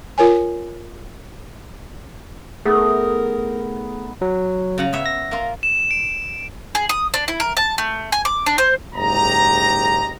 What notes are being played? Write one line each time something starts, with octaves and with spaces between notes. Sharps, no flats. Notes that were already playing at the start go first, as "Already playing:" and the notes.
F4 A#4 C#5 G#5
A3 B3 D#4 G#4 A#4
F#3
C#3 F#5 A#5
B3 C#5 E5
A#6
A#3 F4
E7
D7
G#4
D#6
D4
E4
A#4
A5
A3
G#5
D6
D4
C5
F#1 G#2 G4 D#5 A#5